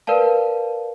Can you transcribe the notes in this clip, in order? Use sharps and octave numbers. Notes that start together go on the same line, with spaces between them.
A#4 B4 D5 F5 A5